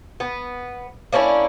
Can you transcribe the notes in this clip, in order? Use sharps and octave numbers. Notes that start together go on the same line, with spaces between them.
B3
A#3 C#4 D4 E4